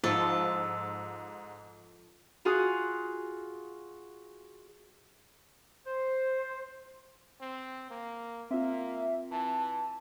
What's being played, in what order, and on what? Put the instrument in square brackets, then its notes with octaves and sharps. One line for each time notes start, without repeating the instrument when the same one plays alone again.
[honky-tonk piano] G#2 [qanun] F3 [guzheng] A4
[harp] F4 F#4 G#4
[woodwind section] C5
[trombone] C4
A#3
[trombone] A#3 [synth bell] C4 F4 [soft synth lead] E5
[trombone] E3 [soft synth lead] A5